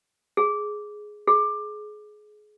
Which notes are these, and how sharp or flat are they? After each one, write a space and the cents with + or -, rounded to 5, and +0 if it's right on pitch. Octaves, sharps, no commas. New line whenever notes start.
G#4 +5
G#4 +25